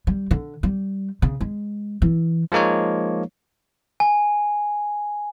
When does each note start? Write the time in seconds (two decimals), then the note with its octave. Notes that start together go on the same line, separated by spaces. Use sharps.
0.07 G3
0.31 D3
0.63 G3
1.22 C#3
1.41 G#3
2.02 E3
2.52 F3 G#3 A#3 D#4 C#5
4.00 G#5